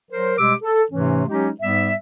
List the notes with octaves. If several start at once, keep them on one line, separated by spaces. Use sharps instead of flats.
F#3 A#4 C5
B2 G3 G#3 G4 D6 E6
A4
G#2 C3 E3 A3 C#4
F#3 G#3 C#4 D#4 G4
G#2 G3 B3 E5